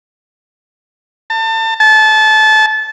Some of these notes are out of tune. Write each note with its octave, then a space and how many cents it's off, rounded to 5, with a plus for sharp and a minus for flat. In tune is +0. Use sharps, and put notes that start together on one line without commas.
A5 +30
A5 -25